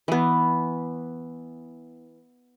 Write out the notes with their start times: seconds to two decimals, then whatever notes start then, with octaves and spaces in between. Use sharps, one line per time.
0.08 E3 B3